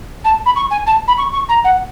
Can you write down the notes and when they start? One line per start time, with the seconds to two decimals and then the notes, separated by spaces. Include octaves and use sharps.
0.24 A5
0.45 B5
0.56 C#6
0.71 G#5
0.86 A5
1.07 B5
1.18 C#6
1.32 C#6
1.49 A#5
1.64 F#5